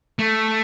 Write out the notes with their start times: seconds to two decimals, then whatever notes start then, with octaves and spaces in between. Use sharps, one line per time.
0.19 A3